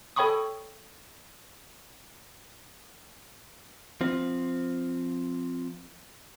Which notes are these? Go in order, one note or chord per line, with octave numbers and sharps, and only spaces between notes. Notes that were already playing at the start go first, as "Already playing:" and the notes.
A4 C#5 G5 B5 C#6 D#6
F3 C4